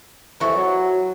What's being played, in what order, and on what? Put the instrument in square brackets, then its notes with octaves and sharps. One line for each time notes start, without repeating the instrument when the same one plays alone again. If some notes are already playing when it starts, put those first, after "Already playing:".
[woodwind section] C2 F2 E3 [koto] E4 F#4 A4
[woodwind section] F#3